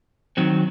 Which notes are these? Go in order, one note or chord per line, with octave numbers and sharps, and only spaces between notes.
D#3 F#3 C4